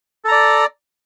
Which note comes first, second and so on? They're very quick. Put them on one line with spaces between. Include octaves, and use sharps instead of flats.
A4 A#5 D5